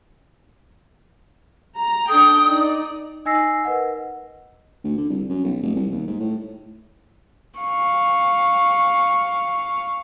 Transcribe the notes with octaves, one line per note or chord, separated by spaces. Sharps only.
A#5
D4 A4 G5 D#6
D#4 D5
D#4 D#5 G#5 E6 A#6 C7
A#4 B4 D#5 F#5
D2
D3
C2
F#2
B1
F1
C2
D#2
G#2
A2
F5 C#6